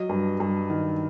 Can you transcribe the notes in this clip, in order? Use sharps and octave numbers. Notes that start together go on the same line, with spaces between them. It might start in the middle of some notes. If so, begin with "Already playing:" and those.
Already playing: F#3 D#5
G2
G2
D#3